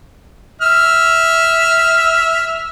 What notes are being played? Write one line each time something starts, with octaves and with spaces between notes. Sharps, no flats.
E5 F6